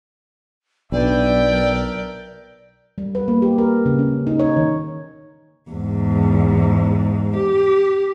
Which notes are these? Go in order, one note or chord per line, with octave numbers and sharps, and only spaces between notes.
B1 D4 B4 D5 E5 G5
A#4
G3
B4
A#3
G4
A#4
C#3
C#4
D#4
C#5
D#3
E2 G#2
G4